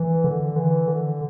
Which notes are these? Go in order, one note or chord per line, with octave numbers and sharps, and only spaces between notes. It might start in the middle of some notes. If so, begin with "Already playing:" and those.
Already playing: E3
D3
E3
D3